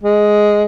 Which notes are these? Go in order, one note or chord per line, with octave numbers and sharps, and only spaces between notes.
G#3